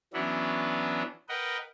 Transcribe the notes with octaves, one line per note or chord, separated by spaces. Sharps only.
E3 F#3 B3 C#4 D4 E4
A#4 B4 D#5 F#5 G5